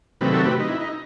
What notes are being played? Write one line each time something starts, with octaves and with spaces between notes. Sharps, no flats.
C3 D#3 F#3 A3 C4 G4 B4
F#4 A4
G4 B4
D#4
E4
D#4